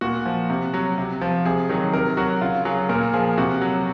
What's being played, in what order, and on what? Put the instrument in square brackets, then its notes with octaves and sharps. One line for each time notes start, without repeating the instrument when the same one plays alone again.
[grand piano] A#2 F#4
F3
C3
F#3
C3
F3
C3 G#4
D#3 F#3
C3 A#4
F#3 F#4
C#3 F4
F#3 G#4
A#2 A#4
F3 G#4
C3 F#4
F#3